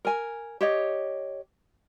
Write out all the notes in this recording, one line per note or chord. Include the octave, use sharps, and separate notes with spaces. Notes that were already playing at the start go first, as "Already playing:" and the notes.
A#4 G#5
G4 C#5 D#5